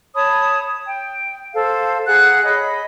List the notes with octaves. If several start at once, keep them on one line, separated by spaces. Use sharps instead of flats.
C#5 A5 B5 D#6
G5
A4 C5 F5
G#4 F#5 A#5 F#6
C#5 D#5 B5